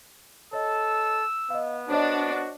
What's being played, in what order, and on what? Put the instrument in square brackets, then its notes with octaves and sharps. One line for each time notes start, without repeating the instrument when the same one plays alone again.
[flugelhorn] A4 [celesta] C#5 D#5 [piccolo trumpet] E6
[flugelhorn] B3 [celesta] D#5 F5
[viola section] D4 [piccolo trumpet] F#4 [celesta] C5 C#5 D#5